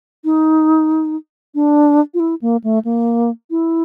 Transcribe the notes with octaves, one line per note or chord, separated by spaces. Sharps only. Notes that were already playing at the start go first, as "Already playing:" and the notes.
D#4
D4
F4
E4
A#3
A3
A#3
E4